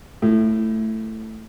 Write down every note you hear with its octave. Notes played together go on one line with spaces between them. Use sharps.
A2